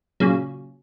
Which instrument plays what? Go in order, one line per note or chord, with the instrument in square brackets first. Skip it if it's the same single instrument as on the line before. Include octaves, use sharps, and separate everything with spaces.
[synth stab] A#2 C#3 F#3